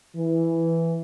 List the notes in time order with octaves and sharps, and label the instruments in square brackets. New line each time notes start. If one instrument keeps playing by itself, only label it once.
[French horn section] E3